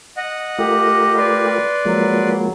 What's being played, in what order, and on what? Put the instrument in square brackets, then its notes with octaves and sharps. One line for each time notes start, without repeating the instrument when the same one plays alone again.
[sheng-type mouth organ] D#5 F#5
[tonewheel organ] A3 F4 A#4 [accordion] G4
[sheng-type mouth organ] B4 D5 C6
[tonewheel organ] F3 G#3 A#3 [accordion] F#3